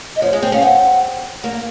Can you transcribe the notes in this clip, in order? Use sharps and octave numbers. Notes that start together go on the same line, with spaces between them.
D#5
F3 C#5
G#3
C4
C#4 F5
C4 F#5
A#3